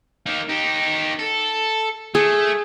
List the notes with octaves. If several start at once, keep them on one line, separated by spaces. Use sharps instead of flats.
A#3 D#4
D#4 G4
A4
A3 G#4